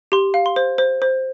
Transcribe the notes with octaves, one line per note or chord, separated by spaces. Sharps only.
G4 C6
F5
C6
C5
C5
C5